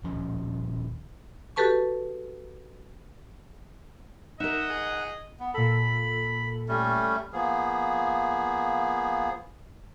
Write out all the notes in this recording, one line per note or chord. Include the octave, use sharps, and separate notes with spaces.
D#1 F3 C#4
F#4 G4 A4 B4 A5 C#6
D#4 A#4 D#5 E5 F#5
G#4
B3
A#2 A4 B5
G3 A3 C#4
F3 A#3 B3 G#4